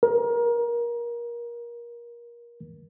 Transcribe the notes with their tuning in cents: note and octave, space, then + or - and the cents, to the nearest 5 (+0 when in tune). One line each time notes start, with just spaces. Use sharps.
A#4 +25